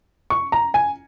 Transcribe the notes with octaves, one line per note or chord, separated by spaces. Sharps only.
C#6
A#5
G#5